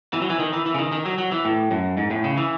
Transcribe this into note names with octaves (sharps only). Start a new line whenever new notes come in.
E3
F#3
E3
D#3
E3
E3
C#3
D#3
D#3
F#3
F#3
E3
A2
F#2
G#2
A2
C#3
E3